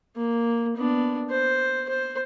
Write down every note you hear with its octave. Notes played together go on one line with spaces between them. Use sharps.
A#3
B3 D4
C5
C5